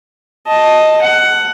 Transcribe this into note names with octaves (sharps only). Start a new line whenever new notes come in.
D#5 A5
F#5